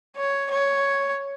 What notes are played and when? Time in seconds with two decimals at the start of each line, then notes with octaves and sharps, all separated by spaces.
0.17 C#5
0.51 C#5